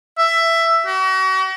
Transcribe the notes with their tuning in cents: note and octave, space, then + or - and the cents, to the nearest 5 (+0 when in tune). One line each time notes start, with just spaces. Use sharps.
E5 +10
F#4 +40